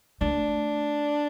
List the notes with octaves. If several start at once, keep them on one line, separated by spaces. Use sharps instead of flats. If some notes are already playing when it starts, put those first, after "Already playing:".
A3 D4